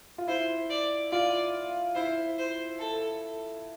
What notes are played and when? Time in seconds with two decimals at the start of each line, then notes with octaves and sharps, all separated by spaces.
0.18 F4
0.27 E4 C5
0.70 D5
1.11 F4 D5
1.95 E4 C5
2.38 C5
2.79 A4